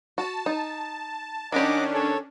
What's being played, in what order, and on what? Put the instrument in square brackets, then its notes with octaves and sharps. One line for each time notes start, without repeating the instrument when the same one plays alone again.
[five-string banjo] F#4 [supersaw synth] A5
[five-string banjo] D#4
[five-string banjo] D#3 G4 [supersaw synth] C#4 D4 [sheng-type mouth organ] D#5 F#5 D6
[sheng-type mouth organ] A4 C#5